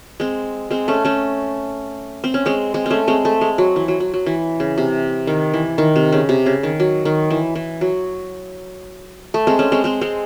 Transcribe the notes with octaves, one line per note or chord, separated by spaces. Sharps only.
G#3 C4
G#3 C4
A3 C#4
A3 C#4
C4
C#4
G#3 C4
G#3 C4
A3 C4 C#4
G#3 C4
A3
G#3
F#3
E3
F#3
F#3
F#3
E3
C#3
C3
D#3
E3
D#3
C3
C#3
C3
C#3
D#3
F#3
D#3
E3
E3
F#3
A3
G#3 C4
A3 C#4
G#3 C4
G#3 C4
G#3 C4